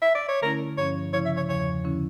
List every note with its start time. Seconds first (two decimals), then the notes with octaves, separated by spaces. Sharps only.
0.02 E5
0.15 D5
0.28 C#5
0.42 D3 A3 C#4 E4 A#4
0.77 G2 F3 C#4 C#5
1.13 C#3 F3 C#4 E4 C#5
1.25 E5
1.37 C#5
1.49 E2 C#3 F3 C#5
1.84 D3 F3 C#4 E4